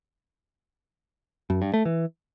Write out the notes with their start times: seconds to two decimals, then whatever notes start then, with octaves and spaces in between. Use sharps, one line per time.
1.50 F#2
1.62 G2
1.74 A3
1.85 E3